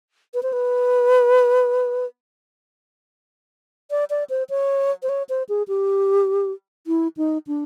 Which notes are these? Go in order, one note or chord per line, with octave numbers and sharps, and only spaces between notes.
B4
C5
B4
D5
D5
C5
C#5
C5
C#5
C5
G#4
G4
E4
D#4
D4